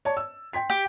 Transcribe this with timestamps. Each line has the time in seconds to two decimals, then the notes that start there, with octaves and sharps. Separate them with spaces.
0.05 C#5 D5 A5
0.17 E6
0.53 G5 C6 B6
0.70 G4